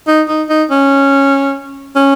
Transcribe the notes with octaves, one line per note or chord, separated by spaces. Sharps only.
D#4
D#4
D#4
C#4
C#4